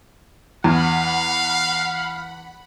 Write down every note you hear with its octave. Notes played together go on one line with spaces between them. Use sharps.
E2 F5 F#5 B5